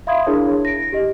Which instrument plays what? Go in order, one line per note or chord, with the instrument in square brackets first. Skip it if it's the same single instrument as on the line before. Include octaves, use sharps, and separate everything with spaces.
[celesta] E5 F5 B5 C6 D#6 G#6
D4 E4 G#4 A#4 C#5
A#6 D7
G4 D#5